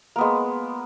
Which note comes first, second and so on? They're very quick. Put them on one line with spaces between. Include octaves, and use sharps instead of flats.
A#3 B3 G#3